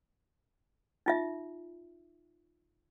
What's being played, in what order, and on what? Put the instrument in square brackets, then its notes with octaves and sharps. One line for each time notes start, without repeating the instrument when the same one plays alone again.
[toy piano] D#4 F4 E5